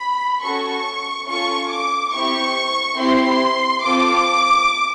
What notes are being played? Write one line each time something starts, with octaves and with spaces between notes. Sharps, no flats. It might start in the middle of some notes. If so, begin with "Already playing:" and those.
Already playing: B5
C#4 F#4 A4 C#6
C#4 F4 A4 C#6
D6
C4 E4 G4 C#6
C4 E4 G4 C6
C4 F4 A4 D6